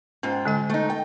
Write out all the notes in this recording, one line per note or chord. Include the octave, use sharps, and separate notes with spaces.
G#2 C#4 F4 G5
D3 G#3 G#5
A3 D#4
G5